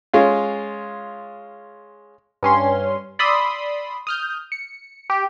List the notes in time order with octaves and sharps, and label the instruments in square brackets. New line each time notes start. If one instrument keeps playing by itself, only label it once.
[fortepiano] G#3 C#4 F4
[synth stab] G2 C#4 C6
D5 B5 C6 D#6 E6
D#6 F6 G6
C#7
G4